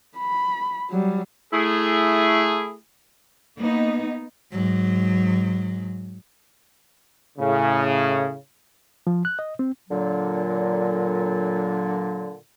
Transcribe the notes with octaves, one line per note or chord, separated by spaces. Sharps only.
B5
F#3 G3
A3 E4 G#4
A#3 B3 D#4
G#2 F#3
A2 C#3
F3
F#6
D#5
C4
A#2 D3 F#3